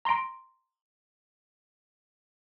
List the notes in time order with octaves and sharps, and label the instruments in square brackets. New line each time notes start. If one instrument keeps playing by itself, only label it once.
[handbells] A#5 C6 A#6 D7